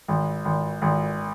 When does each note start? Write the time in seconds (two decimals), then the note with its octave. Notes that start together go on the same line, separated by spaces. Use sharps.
0.08 G#1
0.45 G#1
0.82 G#1